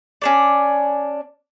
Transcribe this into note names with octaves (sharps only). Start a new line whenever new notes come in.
C#4 D4 D5